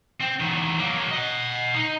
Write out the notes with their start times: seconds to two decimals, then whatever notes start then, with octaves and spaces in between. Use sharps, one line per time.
0.21 C4
0.41 E2 D#3
0.78 F#3 A#3
1.11 D#5 F#5
1.75 D#4